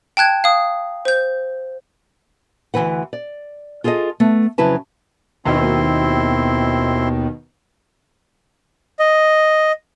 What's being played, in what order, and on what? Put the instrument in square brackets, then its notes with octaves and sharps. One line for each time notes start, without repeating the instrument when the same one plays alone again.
[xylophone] G5 A5 F#6 G#6
F5 D#6
C5 G6
[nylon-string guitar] D2 C3 E3 B4 F#5
D5
F4 G#4 A4 D5 D#5
A3 B3
F2 C#3 F#3 E4 B4 A5
[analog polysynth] D#2 B2 D#3 [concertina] C4 E4 C6
[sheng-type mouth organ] D#5